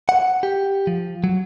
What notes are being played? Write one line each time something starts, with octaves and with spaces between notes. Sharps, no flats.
F#5
G4
F3
F#3